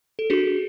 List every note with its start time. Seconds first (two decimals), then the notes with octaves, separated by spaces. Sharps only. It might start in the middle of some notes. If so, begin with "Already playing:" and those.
0.19 A4
0.30 D4 F#4 G#4